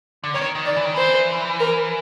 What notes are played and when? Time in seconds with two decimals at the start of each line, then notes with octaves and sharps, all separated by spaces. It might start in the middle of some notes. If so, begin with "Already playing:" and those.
0.24 D3
0.34 D#3 C#5
0.55 D#3
0.65 D5
0.76 E3
0.85 D#3
0.94 E3 C5
1.60 A#4